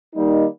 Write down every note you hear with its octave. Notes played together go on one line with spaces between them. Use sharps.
D#3 G3 A#3 D#4